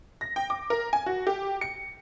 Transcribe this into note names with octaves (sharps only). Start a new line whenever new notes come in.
A#6
G5
D6
A#4
G#5
F#4
G4
C#7